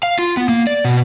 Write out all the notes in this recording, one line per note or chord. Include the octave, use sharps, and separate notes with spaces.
F5
F4
B3
A#3
D5
B2